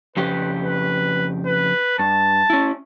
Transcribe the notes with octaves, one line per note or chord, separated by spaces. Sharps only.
F2 C#3 G4 B4
B4
B4
G2 A5
C#4 E4